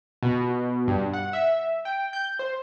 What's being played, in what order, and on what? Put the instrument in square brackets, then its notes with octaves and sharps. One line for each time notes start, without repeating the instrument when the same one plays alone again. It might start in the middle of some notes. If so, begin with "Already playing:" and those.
[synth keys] B2
G2
F#5
E5
G5
G6
C5